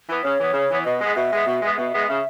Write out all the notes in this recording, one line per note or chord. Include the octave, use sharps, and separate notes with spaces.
E3 B3
C#3 C#5
E3 B3
C#3
E3 B3
B2 D#5
G#3 B3
B2 E5
G#3 B3
B2
G#3 B3
B2 E5
G#3 B3
C#3 E5